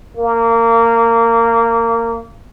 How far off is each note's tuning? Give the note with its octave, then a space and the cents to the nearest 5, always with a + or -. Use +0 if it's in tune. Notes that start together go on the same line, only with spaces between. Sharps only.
A#3 -20